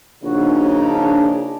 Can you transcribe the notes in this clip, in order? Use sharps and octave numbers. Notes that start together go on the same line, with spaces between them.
A#1 C#3 C#4 D#4 F#4
D4